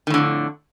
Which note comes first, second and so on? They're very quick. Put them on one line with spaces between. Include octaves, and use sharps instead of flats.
D#3 A2 D3 F2